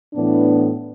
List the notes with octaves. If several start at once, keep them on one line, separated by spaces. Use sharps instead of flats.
A2 E3 B3 D4